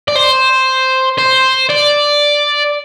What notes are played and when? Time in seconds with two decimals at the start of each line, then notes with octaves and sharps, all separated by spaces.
0.08 D5
0.16 C5
1.18 C5
1.70 D5